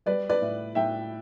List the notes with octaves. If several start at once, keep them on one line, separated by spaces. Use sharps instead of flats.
G3 B4 D5
B4 D5
A2
A2 E5 G5